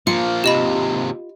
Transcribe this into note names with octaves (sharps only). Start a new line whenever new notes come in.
F3 A#3 F4 F5 C#7
D#2 C3 G4 D#5 B5